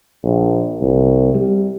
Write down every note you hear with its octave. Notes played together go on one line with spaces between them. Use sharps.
A#1
C2
G3